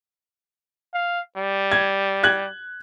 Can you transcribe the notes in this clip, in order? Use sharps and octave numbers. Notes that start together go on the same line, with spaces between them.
F5
G3
G#6
F#6 G#6 F#7